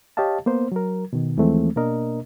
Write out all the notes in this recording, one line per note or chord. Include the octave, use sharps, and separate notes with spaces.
G4 C#5 D#5 F5 A5
A#3 B3 C5
F#3 A#4
B2 D#3
D#2 E3 F3 G#3 A3 C4
B2 A#3 D4 A#4 D#5